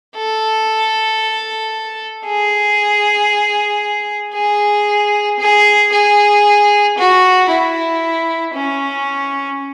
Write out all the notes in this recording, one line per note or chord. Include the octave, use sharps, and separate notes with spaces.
A4
G#4
G#4
G#4
G#4
F#4
E4
C#4